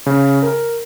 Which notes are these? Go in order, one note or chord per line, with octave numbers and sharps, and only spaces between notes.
C#3
A#4